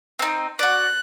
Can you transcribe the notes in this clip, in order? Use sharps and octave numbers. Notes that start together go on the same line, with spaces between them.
C4 D#4
F#4 D5 F#6